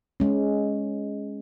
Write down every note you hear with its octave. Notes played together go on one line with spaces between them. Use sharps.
G#3 C#4